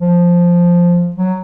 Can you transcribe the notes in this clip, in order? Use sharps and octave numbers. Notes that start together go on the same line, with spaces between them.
F3
F#3